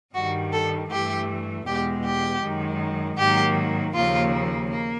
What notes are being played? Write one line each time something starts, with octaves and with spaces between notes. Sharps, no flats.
G2 D#3 G3 F#4
A4
G2 E3 A3 G4
E2 B2 G#3 G4
G4
F#2 D#3 G#3
G#2 D#3 F#3 A#3 G4
D#2 C#3 F3 A#3 F4
A#3